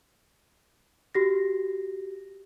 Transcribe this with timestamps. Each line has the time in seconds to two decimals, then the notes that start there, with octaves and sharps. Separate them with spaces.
1.15 F#4 G4 A#6